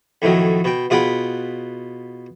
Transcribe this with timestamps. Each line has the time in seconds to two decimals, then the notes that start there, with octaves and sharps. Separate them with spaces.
0.22 F2 A2 D#3 F#3
0.64 B2 G5
0.90 B2 F4 G#4 F#5 G5 B5